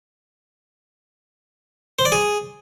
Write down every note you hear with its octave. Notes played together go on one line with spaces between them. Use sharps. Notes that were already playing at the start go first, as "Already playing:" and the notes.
C5
D5
G#4